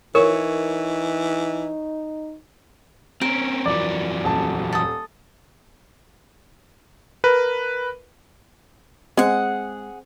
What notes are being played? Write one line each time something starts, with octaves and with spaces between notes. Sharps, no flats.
E3 D#4 A#4 C#5
C4 C#4 A#4
F2 E3 F#3 D5 D6
D#1 A5
A4 D#6
A#4 B4
G#3 C4 G#4 F#5